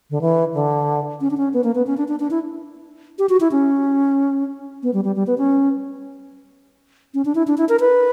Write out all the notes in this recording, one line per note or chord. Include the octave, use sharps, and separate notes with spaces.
D3
E3
D3
C#4
D4
C#4
B3
A#3
B3
C#4
D4
D4
D4
E4
G4
F#4
E4
C#4
B3
G3
G3
G3
B3
C#4
C#4
D4
E4
D4
E4
A#4
B4